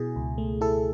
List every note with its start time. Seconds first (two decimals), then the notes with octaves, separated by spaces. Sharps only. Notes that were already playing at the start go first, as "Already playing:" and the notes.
Already playing: B2 E4 G#4
0.16 C#2
0.38 A3
0.61 E4 A4